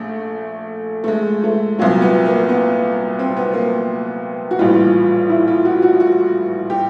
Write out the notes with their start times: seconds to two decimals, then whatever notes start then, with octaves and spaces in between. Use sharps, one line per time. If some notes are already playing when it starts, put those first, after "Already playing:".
Already playing: A#1 A3
1.04 A3
1.08 G#3
1.44 A3
1.79 C2 A#2 F#3
2.02 B3
2.25 A#3
2.49 B3
3.19 C4
3.37 B3
3.53 A#3
4.51 F#4
4.59 A#1 A2 E3 G3 F4
5.29 E4
5.47 F4
5.65 F#4
5.82 F#4
6.00 F#4
6.70 G4